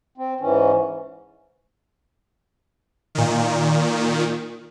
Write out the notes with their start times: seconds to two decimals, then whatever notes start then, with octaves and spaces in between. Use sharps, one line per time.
0.18 C4
0.40 G#2 E3 C#4
3.15 A#2 D#3